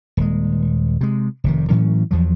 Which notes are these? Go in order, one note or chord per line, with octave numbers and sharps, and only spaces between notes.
D#1 G#3
C3 G#3
F1 C3 D#3
A2 E3 F#3 C#4
E2 F3 F#3